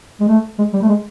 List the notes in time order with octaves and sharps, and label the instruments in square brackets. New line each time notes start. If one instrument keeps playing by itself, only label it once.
[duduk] G#3
A3
G#3
G3
A3
G#3